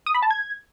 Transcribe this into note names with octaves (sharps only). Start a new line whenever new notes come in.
D#6
B5
A5
G#6